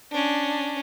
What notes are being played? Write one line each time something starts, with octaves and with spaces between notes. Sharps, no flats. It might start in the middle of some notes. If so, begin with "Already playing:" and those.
C#4 D4